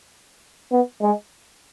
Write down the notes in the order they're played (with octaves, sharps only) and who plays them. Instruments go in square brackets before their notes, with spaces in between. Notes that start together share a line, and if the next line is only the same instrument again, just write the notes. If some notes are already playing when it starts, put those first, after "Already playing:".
[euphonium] B3
G#3